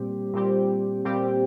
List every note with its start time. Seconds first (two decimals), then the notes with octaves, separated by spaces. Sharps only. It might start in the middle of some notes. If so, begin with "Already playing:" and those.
Already playing: A#2 G3 C4 G4
0.33 A#2 G3 C4 G4
1.05 A#2 G3 C4 G4